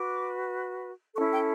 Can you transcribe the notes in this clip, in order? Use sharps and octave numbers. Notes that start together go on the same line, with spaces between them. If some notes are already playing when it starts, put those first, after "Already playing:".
Already playing: F#4 B4 D6
C#4 E4 A4 C#6
G5